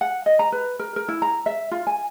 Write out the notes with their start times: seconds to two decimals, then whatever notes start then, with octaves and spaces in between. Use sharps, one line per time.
0.01 F#5
0.26 D#5
0.39 A#5
0.52 B4
0.79 A#4
0.96 A#4
1.08 E4
1.22 A#5
1.46 E5
1.71 F4
1.87 G#5